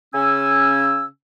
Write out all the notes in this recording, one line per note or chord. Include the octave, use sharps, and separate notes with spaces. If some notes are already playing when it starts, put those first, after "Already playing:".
C#3 C#4 G#5 E6